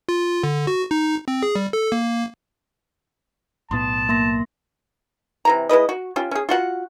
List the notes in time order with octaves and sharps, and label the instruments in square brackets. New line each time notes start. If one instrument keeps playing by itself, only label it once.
[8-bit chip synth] F4
D3
F#4
D#4
C4
G#4
G3
A4
A#3
[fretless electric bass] B1 A2 B3 [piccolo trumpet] A5 [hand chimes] C6 D#6
[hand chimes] A#3 C6 A#6
[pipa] C3 E3 A#5
G#3 E4 B4 D#5
F#4
C#4 F4 G4
C#4 G#4
F4 F#4 F#5